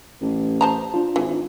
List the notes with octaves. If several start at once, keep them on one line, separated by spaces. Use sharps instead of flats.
A1
C5 A5 A#5
D4 F4
G#1 E3